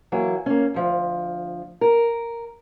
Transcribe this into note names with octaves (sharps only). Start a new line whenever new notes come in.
E3 F#3 A#3 C#5
A#3 C#4
D2 F3
A#4